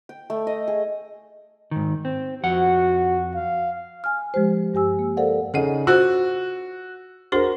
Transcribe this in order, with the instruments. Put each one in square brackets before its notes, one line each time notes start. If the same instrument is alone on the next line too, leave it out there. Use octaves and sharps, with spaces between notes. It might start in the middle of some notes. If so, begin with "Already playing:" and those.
[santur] G5
A3
D#5
G#4
[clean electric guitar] G#2 D#3
C4
[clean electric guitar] F2 F#5 [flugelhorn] F#4
[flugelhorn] F5
[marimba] G#5 F6
F3 G#3 G4 C5
G2 G4 G#5 E6
A#3
A4 A#4 C5 D5 F5 F#5
[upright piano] C#3 D#4 [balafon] A4 D#5 F#5
[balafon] F4 C5 [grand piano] F#4 [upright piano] E6
[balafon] D4 G#4 C5 [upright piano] F#4 A#4